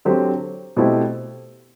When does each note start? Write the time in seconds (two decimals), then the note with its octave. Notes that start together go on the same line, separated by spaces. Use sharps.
0.05 D3 F#3 C4 G4
0.76 B2 A3 C4 E4 G4